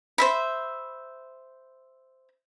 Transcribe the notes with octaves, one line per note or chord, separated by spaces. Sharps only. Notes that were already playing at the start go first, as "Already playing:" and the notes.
C5 E5 B5